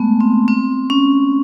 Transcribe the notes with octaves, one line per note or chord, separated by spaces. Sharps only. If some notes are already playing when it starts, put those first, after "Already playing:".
Already playing: G#3 A3 B3
C4
C4
C#4